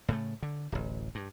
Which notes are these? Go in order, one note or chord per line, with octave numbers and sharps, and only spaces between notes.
A2 C#3 A3
D3
D1 A1
G2